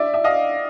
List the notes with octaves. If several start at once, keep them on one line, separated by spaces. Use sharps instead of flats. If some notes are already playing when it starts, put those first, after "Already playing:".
Already playing: D5 E5
E5
D#5 F5